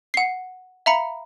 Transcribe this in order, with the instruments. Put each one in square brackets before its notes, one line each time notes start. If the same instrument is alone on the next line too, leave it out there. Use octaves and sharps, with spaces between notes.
[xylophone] F#5 C7
E5 F5 A#5 B5 C#7